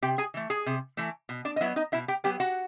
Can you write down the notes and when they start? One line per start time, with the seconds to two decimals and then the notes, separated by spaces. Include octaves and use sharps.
0.02 C3 G4 G5
0.18 G#4 G#5
0.34 E3 A3
0.50 G#4 G#5
0.66 C3
0.97 E3 A3
1.29 B2
1.45 D4 D5
1.56 D#5
1.61 F#3 B3 E4 E5
1.76 D#4 D#5
1.92 B2 E4 E5
2.08 G4 G5
2.24 F#3 B3 G4 G5
2.40 F#4 F#5